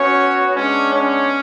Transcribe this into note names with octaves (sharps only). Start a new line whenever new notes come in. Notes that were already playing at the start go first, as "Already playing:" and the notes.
Already playing: B3 C#4 F#4 C#5
G#3 B3 C#4 D4 C#5
C#4 C#5